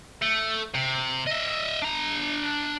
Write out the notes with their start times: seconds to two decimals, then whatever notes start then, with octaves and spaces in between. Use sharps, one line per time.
0.22 A3
0.74 C3
1.27 D#5 E5
1.82 D4 A#5